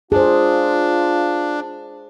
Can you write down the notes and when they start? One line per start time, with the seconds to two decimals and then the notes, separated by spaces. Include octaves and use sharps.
0.12 D4 F4 G#4 C5